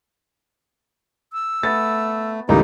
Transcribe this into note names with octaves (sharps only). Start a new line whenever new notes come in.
E6
A3 B3 A6
C#2 E3 G3 A3 A#3 D#4